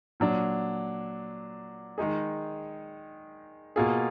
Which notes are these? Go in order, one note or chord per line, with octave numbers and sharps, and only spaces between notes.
A#2 F#3 D4
D#3 G#3 D#4 G#4
B2 A#3 F4 G#4